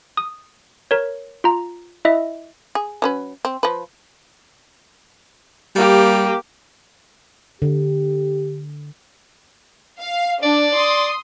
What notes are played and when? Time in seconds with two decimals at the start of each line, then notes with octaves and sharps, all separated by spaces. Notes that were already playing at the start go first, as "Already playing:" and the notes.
0.17 D#6
0.91 A#4 C#5
1.44 F4 A#5
2.05 E4 D#5 E5
2.75 G#4
3.02 F#3 C#4 B4
3.45 C4
3.63 F3 B4
5.76 G3 A#3 G4
7.62 D3 G4
10.00 F5
10.43 D4 D5
10.75 C6 D#6